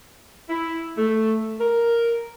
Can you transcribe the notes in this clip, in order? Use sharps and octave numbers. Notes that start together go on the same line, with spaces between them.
E4
A3
A#4